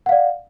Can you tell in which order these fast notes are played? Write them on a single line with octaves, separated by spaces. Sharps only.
F#5 F5 D5